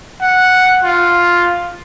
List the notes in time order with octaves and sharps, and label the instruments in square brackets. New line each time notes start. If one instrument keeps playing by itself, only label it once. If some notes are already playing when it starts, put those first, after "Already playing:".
[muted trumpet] F#5
F4